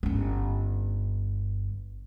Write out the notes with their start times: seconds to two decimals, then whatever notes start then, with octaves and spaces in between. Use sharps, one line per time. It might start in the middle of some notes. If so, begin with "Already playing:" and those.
0.03 G1 C#4